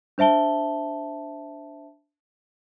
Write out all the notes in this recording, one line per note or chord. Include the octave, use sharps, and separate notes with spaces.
D4 C5 E5 A5 G7